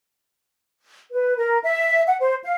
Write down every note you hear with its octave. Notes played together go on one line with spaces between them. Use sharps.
B4
A#4
E5
F#5
C5
F5